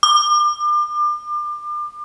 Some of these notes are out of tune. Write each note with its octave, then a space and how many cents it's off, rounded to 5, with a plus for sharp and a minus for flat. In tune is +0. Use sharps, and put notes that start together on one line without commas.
D6 +35